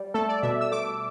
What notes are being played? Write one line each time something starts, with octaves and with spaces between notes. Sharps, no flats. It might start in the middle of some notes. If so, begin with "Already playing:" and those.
Already playing: G3
A3 A4
D5
B2 E5
E6
A3 D6